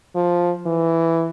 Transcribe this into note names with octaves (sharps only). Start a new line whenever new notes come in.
F3
E3